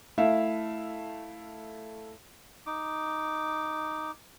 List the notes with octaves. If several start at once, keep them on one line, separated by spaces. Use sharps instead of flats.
A3 E4 E5 F5
D#4 D6